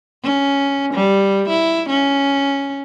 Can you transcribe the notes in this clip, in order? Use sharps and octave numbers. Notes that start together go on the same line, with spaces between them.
C#4
G3
E4
C#4